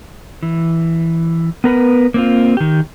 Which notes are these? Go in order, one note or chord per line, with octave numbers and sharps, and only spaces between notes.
E3
B3 A#4 B4
A#3 C4 F4
D#3 G4